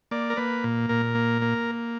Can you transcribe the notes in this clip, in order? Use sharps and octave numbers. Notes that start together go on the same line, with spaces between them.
A#3 D5
A#4
A#3 B4
A#2
A#2 A#4
A#3
A#3